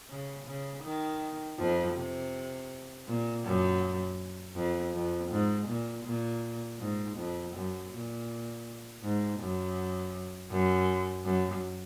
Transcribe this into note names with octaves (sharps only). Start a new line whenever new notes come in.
C#3
C#3
D#3
F2 F3
C3
A#2
F#2
F2
F2
G#2
A#2
A#2
G#2
F2
F#2
A#2
G#2
F#2
F#2
F#2